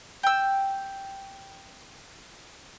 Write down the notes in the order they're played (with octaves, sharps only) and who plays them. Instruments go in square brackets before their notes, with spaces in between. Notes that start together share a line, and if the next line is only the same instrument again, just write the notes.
[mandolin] G5 E6